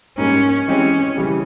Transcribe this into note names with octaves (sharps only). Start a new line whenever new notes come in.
G#2 G3 A#3 C#4
E3 G#3 C4 C#4 G4
C#3 E3 G3